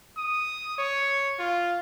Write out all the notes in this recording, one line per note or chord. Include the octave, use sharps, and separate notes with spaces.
D#6
C#5
F4